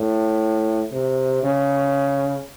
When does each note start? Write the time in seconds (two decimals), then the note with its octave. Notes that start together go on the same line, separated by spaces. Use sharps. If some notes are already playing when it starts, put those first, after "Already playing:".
Already playing: A2
0.92 C3
1.43 C#3